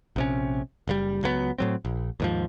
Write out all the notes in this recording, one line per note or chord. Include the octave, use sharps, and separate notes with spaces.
A#1 C3 C#4
F#1 A2 G3
C#2 F#3 G#3 B3
A2 F#3 C4
A#1
D#2 G#2 F3